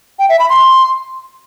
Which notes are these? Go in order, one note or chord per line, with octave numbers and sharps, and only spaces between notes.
G5
E5
B5
C6